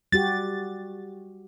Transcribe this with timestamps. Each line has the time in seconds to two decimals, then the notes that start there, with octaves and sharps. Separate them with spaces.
0.12 G3 F#4 G4 A6